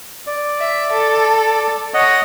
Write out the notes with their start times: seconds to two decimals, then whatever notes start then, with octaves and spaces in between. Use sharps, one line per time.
0.27 D5
0.59 E5
0.92 A4
1.94 C#5 D#5 F#5